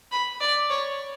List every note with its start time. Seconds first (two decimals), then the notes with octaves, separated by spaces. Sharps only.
0.12 B5
0.40 D5
0.70 C#5